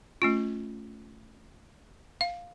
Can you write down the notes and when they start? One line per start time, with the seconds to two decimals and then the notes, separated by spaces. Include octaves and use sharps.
0.22 A3 C#4 F4
2.21 F5